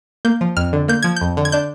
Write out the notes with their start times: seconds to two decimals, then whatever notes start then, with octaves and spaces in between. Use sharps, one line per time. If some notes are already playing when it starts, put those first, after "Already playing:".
0.25 A#3 G6
0.41 F3
0.57 F2 F6
0.73 D3
0.88 A#3 G6
1.02 F3 G#6
1.16 F2 G6
1.37 D3
1.45 G#6
1.52 D4 G6